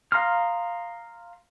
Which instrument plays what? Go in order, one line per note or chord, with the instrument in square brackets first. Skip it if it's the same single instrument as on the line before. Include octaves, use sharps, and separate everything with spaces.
[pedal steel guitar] F5 A#5 C6 D#6 F6